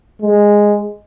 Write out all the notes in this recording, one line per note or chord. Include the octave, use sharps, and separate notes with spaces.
G#3